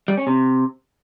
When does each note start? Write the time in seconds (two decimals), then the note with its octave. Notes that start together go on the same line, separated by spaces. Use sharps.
0.08 G3
0.17 C#4
0.27 C3